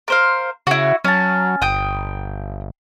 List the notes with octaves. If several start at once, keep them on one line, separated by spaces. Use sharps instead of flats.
A#4 C5 F5
C#3 E4 F#4
F#3 C#4 A5
G1 G5 D#6